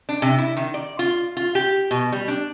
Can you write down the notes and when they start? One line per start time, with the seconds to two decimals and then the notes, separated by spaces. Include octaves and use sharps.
0.09 D4
0.22 C3
0.38 E4
0.57 D#3
0.74 D5
0.99 F4
1.37 F4
1.55 G4
1.91 B2
2.12 G3
2.28 D4